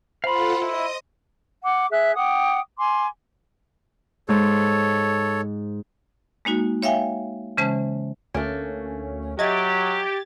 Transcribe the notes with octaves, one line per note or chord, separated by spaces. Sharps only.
F4 A4 C5 F5 F#5 B5 C6
E4 D#5 D#6
F#5 D6
G#4 E5 F#6
F#5 G5 D6 D#6
G#5 C6 D6
G#2 A4 C#5
G#3 A#3 D#4 F#4
C#5 E5 F5 G5 G#5
C#3 E3 G#3 C#4 C5 A5
D2 A3 A#3 C#4
F#3 G4 D#5 E5 G#6 A6